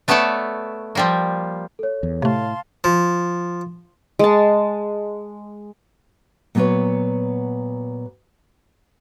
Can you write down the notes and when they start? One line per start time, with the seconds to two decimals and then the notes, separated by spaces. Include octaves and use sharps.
0.08 A3 B3 A4 C#5 D5 A5
0.95 F3 G3 A#3
1.79 A4 C#5
2.03 E2
2.22 A2 C3 A3 F5 A5 C6
2.84 F3
4.19 G#3 A5
6.55 A#2 F#3 B3 G4 B4 C#5